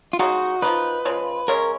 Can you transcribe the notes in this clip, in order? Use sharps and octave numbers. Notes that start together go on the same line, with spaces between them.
F4
C#3 G#3 D#4 F#4
F3 A#3 D#4 B4
C#3 F3 G#3
C#3 G#3 C#4 A#4